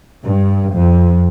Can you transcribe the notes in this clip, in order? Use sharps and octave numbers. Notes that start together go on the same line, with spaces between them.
G2
F2